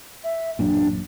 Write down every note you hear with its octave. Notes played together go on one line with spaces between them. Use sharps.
E5
A1 F#2 A#2 D4